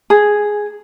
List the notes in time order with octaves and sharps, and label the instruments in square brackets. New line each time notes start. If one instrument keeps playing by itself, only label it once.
[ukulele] G#4